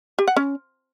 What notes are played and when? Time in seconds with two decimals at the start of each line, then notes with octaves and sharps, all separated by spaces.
0.19 G4
0.28 F#5
0.37 C#4